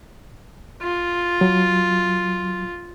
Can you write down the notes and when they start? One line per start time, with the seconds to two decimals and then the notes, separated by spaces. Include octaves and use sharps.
0.82 F4
1.41 F#3